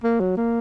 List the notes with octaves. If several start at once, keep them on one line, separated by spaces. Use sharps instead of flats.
A#3
F#3
A#3